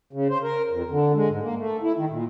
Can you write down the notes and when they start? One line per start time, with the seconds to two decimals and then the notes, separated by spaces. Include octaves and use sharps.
0.13 C#3
0.30 C5
0.43 A#4
0.70 F2
0.90 D3
1.15 G#3
1.29 G#2
1.42 A#3
1.57 A3
1.83 E4
1.97 D#3
2.10 A#2